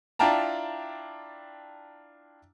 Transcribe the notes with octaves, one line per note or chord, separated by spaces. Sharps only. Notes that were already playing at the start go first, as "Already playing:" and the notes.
D4 E4 F4 G5 A5 A#5